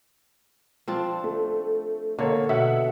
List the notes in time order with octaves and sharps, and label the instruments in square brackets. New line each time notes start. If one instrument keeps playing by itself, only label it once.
[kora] F3 C4 D4
[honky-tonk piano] A3
[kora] D3 [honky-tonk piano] A#3 C#5
[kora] B2 [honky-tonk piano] E5 F#5